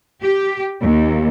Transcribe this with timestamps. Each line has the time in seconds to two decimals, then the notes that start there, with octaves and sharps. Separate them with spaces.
0.23 G4
0.81 D#2